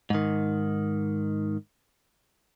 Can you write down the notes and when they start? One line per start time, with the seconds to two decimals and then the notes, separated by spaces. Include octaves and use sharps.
0.10 G#2 D#3